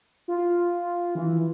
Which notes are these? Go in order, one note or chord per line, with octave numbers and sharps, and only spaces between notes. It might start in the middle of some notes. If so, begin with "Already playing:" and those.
F4
E3